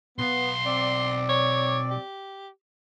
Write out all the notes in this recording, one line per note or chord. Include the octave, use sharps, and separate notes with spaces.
B1 B3 F5 C6
C4 D5
C#5
G4